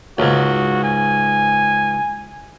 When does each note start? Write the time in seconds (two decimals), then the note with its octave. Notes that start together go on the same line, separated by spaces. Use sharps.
0.18 C#2 G#2 F#4
0.84 G#5